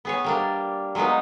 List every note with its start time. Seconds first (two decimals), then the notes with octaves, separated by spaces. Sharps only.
0.05 B3 G#4 C#5
0.24 G3 A#3 D4
0.95 F#3 G#3 A#3 B3 D#4